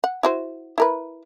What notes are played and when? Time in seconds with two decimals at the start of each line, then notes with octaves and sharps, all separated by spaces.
0.04 F#5
0.23 E4 F#4 C5
0.78 E4 A#4 B4